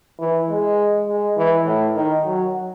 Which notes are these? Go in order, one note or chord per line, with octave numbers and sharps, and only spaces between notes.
E3
G#3
G#3
E3
A2
D#3
F#3